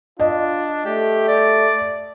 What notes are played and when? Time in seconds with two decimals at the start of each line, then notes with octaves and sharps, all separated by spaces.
0.20 D4 F4 D#5
0.85 A3 G4
1.28 D5